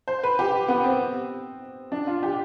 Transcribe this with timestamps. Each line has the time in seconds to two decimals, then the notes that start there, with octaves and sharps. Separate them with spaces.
0.08 C5
0.24 B4
0.39 G4
0.68 B3
0.84 C4
1.92 D4
2.07 F4
2.23 G4